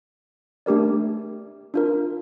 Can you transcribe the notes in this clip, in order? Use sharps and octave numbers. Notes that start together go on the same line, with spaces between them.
A3 D4 G4 A#4 D5
D4 F4 A#4